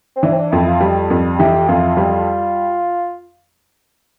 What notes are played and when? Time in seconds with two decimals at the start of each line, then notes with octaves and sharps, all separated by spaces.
0.16 C4
0.23 E3 D4
0.32 C4
0.37 D4
0.52 F2 E4
0.66 F4
0.81 G3
1.10 F2
1.39 E3 G4
1.68 F2 F4
1.97 G3